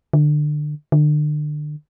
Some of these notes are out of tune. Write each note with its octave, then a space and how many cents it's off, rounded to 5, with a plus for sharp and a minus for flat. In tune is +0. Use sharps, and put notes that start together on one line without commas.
D3 +25
D3 +35